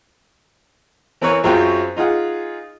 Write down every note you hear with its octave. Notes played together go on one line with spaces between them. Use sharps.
E3 C4 A#4 B4 C#5
F#2 F#3 C4 F4 G#4 G5
D#4 F4 G#4 F#5